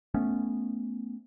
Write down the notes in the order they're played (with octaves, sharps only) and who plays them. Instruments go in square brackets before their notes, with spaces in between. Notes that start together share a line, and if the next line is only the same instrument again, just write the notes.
[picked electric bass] A3 B3 C#4